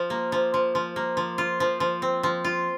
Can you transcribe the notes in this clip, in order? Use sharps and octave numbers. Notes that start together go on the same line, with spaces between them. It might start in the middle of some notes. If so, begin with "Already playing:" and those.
Already playing: F3
A#3
F3
F3
F3
A#3
F3
F4
F3
F3
C4
F3
F4